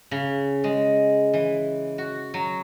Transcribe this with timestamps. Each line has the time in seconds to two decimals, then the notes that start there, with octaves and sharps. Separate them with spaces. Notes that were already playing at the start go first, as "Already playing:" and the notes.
0.11 C#3
0.64 G#3
1.33 E3
1.98 F#4
2.34 F#3